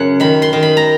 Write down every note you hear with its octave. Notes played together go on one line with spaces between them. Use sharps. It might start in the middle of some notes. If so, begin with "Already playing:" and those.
Already playing: F#2 C#3 F#5
D#3 B5
C6
D#3
B5
A#5